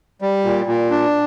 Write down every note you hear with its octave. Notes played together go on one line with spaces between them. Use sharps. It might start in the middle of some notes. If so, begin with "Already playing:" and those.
G3
A#2
A#2
D4